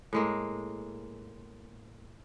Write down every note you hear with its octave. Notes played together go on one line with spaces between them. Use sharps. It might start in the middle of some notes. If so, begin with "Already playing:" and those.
A2 G#3 A#3